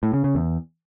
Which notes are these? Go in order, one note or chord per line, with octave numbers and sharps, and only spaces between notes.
A2
C#3
C#3
E2